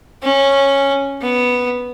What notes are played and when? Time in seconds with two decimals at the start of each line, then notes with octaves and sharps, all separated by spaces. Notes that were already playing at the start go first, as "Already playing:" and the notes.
0.23 C#4
1.22 B3